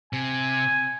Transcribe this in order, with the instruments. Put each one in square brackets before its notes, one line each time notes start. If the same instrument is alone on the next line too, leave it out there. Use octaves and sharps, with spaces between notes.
[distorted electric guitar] C3 [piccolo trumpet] G#5